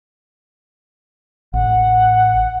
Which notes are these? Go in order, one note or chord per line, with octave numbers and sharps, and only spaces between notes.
A1 F#5